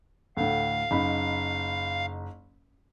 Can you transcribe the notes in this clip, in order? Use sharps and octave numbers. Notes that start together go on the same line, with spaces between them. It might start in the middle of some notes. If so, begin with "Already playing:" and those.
D2 A2 F5
F#1 D#4 B5